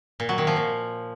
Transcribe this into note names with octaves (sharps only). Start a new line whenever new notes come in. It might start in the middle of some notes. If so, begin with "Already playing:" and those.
A#2
F#3
D#3
F3
A#2